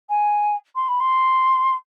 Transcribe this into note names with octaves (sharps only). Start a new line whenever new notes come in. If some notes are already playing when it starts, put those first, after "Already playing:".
G#5
C6
B5
C6